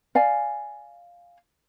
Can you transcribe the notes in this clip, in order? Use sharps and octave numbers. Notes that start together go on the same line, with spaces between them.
D5 F5 G#5